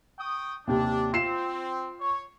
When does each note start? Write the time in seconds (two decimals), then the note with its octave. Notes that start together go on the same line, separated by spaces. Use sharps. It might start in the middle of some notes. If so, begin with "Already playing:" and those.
0.19 G5 C#6 D#6
0.67 D#2 C3 D4
1.13 C4 F4 C7 E7
2.00 C#5